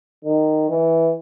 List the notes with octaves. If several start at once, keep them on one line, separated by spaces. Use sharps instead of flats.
D#3
E3